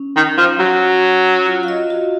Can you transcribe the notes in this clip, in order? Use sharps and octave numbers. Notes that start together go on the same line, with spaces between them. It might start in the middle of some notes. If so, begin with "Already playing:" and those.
Already playing: C#4
D#3
F3
F#3
F4
F5
D#5
F#4